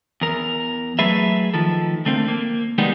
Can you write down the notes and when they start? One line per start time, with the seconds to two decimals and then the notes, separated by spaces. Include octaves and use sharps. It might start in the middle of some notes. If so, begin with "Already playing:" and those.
0.21 E2 A#4
0.99 F#3 A3 G#4 B4 E5
1.54 D#3 F3 A4
2.05 D3 A3 A#3 C4
2.28 A#3
2.78 D#3 G3 G#3 A#3 B3 D#4